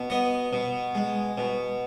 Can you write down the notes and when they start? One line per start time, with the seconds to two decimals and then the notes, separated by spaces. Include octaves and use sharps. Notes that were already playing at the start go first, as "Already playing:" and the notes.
Already playing: B2
0.10 B3 D#5
0.53 B2
0.95 G#3
1.38 B2